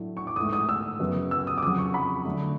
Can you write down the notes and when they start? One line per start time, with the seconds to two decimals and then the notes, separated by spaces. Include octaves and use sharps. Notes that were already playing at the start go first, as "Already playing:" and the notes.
Already playing: A2 F#3 A3 D4
0.17 C#6
0.27 D6
0.36 G#2 E3 A3 D#6
0.53 D#6
0.69 E6
0.99 F#2 C#3 F#3 B3
1.31 E6
1.47 D#6
1.58 D6
1.63 F2 C#3 F#3 D#6
1.78 C#6
1.94 B5
2.25 D3 F#3 A3